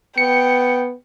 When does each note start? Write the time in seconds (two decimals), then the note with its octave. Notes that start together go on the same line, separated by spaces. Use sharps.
0.18 B3 G5 C#7